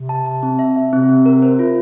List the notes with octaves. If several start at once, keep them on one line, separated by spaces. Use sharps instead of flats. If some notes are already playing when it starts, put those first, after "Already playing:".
Already playing: C3
A5
A5
C4
E5
E5
C3 C4
C4
A#4
C5
F4